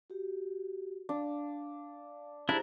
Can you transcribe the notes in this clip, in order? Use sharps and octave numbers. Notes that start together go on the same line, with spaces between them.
F#4 G4
D4 F5
D4 E4 G4 G#4 C5 A#5